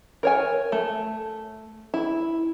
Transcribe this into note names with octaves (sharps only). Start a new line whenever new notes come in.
A#4 C#5 G#5
A3
E4